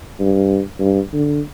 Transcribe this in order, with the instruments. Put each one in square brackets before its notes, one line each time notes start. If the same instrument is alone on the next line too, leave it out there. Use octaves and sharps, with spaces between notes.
[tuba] G2
G2
D3